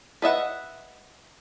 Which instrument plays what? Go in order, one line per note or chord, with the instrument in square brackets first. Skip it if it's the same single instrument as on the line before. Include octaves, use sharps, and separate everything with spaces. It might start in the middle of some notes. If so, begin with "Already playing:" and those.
[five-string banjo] B4 D#5 E5 F#5